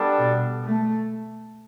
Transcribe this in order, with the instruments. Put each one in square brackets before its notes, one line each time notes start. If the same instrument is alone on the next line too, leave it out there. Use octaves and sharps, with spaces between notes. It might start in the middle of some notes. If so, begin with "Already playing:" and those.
Already playing: [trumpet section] G3 B3 D4 A4
[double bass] B2
A3